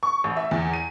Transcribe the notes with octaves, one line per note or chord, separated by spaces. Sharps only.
C#6
A1
E5
E2
D#7